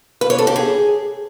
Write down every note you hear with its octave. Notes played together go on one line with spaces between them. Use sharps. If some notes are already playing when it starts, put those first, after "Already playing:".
B4
C#5
A4
G4
G#4